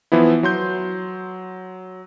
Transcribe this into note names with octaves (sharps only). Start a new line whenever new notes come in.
E3 F3 B3 E4
F#3 C6 G6